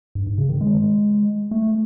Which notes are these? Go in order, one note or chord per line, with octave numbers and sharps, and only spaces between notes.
G2
G#2
C#3
D#3
G#3
A3